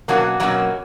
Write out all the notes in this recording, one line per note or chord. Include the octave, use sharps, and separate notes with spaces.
B2 F#3 A#3 C#4 F#4
B2 F#3 A#3 C#4 F#4